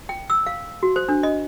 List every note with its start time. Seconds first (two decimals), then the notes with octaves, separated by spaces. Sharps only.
0.09 G5
0.30 E6
0.47 F5
0.83 F#4
0.96 C5
1.09 D4
1.23 D#5